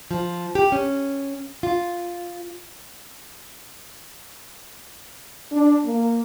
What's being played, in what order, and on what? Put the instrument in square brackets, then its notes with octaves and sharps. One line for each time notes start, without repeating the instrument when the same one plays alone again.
[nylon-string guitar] F3
G4
C#4
F4
[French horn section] D4
A#3